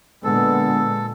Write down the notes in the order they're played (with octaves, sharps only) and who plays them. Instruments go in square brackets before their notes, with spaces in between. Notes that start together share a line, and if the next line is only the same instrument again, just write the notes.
[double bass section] A#2 G#3 [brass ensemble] D3 B3 [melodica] A4